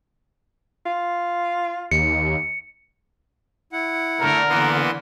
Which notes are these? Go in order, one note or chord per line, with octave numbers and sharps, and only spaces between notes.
F4
D#2 C#7
E4 F#5
D3 A3 A#4
E3 A#3 B3 C6